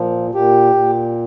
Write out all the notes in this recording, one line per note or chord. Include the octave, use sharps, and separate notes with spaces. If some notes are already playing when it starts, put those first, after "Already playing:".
Already playing: A#2 F3
A#2 G4
A#2